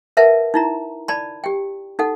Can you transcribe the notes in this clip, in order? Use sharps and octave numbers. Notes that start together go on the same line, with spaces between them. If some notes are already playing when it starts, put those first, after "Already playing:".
A#4 B4 E5 F#5 A5
D#4 E4 A#5
D5 A5 B5
G4 G5
D#4 A4 F#5